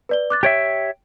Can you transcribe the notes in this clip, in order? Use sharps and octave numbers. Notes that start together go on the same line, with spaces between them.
B4 D5 G7
D6 F#6 A6
G4 C#5 E5 G5 D7